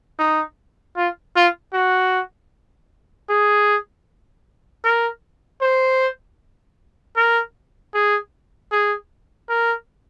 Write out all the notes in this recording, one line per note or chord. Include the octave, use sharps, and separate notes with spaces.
D#4
F4
F4
F#4
G#4
A#4
C5
A#4
G#4
G#4
A#4